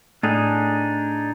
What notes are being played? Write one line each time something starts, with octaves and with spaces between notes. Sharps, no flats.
A2 D4 D#4 G#4